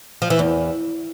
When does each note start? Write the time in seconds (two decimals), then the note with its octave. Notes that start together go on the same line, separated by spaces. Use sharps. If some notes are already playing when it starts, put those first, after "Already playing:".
0.22 F3
0.30 E3
0.39 E2